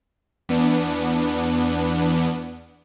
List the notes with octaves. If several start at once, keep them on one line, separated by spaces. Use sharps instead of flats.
E2 B3 D4